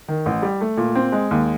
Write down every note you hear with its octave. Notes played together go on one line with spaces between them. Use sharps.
D#3
A1
G3
A3
A#2
C4
G#3
D#2